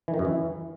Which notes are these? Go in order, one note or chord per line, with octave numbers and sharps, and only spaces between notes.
E3
D#3
F#2
E3